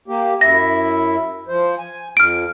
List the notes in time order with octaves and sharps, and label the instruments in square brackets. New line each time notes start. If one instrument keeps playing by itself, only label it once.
[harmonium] A#3 G4
[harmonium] F#2 E4 E5 [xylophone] A#6
[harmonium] F3 C5
G#5
[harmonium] F2 [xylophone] F6 D7